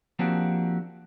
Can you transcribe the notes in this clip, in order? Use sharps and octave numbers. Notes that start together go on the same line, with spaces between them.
F3 A#3 C4 D4 F#4 G4